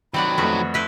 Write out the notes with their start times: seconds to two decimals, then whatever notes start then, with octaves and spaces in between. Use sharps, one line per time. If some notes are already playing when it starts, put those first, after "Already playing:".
0.14 D#3 F#3 C4 D5 F#5 B5
0.38 F2 A3 B3 F#4
0.74 E4 B4 C5